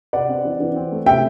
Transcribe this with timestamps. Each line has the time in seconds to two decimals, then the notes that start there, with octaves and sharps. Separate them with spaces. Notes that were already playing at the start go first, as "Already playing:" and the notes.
0.13 C3 D5 F#5
0.29 C4
0.45 E3
0.60 E3
0.76 C4
0.92 A3
1.06 C3 E5 G5